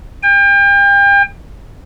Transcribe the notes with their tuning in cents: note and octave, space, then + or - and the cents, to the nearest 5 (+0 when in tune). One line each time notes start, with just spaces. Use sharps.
G5 +35